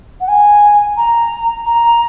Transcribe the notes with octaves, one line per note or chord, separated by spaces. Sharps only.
F#5
G#5
A#5
A#5